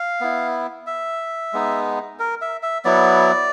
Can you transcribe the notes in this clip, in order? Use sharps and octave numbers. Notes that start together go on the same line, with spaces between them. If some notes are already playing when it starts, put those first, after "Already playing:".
Already playing: F5
B3 E4
E5
G#3 B3 D#4
A#4
E5
E5
F#3 B3 E4 D5